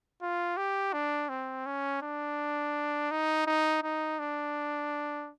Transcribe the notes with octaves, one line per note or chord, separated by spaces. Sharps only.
F4
G4
D4
C4
C#4
D4
D#4
D#4
D#4
D4